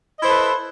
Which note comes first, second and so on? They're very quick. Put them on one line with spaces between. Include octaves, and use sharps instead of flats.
D#5 E4 C5 A4 B4